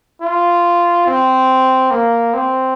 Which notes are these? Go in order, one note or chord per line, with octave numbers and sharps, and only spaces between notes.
F4
C4
A#3
C4